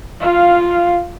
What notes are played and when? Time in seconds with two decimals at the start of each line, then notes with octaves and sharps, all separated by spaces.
0.21 F4 F5